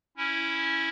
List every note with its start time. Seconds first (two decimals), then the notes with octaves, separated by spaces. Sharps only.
0.17 C#4 E4